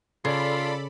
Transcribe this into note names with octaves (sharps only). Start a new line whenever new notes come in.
C#3 F4 A4 D5 B5